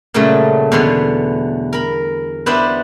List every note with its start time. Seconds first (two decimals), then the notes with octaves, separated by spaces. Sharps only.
0.14 A#2 C#3 F#3 G3 A3
0.72 E2 B2 D3 B4 C#5 C6
1.73 A#4 B5
2.46 B3 D4 E4 G4 B4 C5